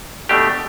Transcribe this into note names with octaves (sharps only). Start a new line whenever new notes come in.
B2 A3 D4 G4